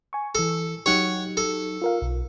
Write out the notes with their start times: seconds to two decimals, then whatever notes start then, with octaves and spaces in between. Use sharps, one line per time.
0.13 G#5 C#6
0.35 E3 A4 E6
0.86 F#3 D#4 G4 C#5 F#5
1.37 A4
1.82 F4 A#4 F5
2.02 B1